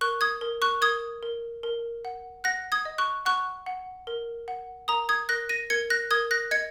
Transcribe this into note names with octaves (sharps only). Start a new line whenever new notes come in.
A#4 C#6 F#6
D#6 G#6
A#4
C#6 F#6
A#4 D#6 G#6
A#4
A#4
F#5
F#5 F#6 A#6
D#6 G#6
D#5
C#6 F#6
F#5 C#6 F#6
F#5
A#4
F#5
A#4 A#5 D#6
D#6 G#6
A#4 F#6 A#6
A#6 D#7
A#4 G#6 C#7
F#6 A#6
A#4 D#6 G#6
F#6 A#6
D#5 G#6 C#7